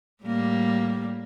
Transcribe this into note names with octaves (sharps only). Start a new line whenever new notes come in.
A2 G3 A#3